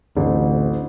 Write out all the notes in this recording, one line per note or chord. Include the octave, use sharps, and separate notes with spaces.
A1 D2 C4